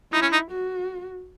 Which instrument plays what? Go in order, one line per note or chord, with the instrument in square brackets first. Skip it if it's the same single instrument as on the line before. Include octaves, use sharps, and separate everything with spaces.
[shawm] D#4 [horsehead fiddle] E4
[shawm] C#4
D#4
[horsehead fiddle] F#4